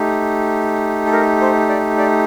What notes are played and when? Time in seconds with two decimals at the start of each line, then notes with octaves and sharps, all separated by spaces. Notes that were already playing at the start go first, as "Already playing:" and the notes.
Already playing: A3 D#4 G4
1.06 A4
1.13 A#4
1.41 C5
1.69 D5
1.98 D5